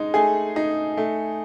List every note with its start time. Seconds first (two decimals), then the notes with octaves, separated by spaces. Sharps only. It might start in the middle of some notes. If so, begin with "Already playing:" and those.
Already playing: G#3 D#4
0.14 A3 G#4 G#5
0.56 D#4
0.97 A3